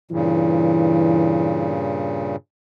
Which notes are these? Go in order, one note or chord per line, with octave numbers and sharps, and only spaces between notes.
G2 A#2 C#3 E3